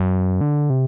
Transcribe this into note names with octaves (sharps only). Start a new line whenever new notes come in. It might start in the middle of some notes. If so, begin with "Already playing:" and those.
Already playing: F#2
D3
C3